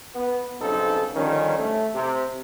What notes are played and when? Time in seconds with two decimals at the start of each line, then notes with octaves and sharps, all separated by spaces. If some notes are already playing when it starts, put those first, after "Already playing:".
0.15 B3
0.61 B1 G2 C#3 C4 D#4 A4
1.16 D3 D#3 F3 G3 C#4
1.59 A3
1.95 C3